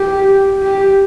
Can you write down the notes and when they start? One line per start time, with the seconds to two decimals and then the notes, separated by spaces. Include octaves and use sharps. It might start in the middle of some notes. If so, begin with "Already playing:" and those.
Already playing: G4
0.62 G4